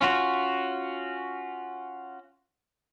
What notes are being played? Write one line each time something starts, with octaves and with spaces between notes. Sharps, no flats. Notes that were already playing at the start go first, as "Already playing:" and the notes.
C#4 F4 F#4